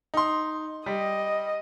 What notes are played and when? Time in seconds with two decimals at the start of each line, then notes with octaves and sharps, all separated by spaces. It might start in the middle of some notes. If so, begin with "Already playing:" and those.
0.14 D#4 C6
0.86 G3 D#5